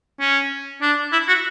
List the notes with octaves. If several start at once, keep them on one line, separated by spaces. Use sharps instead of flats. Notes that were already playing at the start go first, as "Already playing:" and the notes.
C#4
D4
E4
F#4